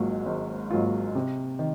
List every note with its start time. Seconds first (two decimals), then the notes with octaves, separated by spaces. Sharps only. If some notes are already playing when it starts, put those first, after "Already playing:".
Already playing: G#1 G#2 F#3 A#3 F4
0.26 G#1
0.71 G#2 F#3 A#3 F4
1.15 C3
1.59 D#3